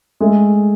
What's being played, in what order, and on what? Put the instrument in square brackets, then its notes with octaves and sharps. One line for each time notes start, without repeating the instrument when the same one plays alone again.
[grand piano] G#3 [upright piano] A3